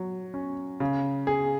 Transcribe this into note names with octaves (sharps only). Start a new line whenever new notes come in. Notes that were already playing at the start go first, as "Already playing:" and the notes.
Already playing: F#3
C#4
C#3
G#4